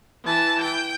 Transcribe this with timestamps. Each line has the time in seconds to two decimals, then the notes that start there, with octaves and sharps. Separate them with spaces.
0.24 E3 A5
0.62 G5